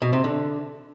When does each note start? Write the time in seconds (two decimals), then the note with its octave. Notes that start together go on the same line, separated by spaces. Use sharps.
0.02 B2
0.13 C3
0.24 D3